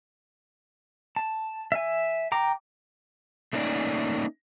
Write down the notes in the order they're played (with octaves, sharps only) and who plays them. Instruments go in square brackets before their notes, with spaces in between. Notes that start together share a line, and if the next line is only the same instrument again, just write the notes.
[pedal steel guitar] A5
E5 G#5
G5 A#5 D6
[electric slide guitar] A3 A#3 C#4 D#4 D5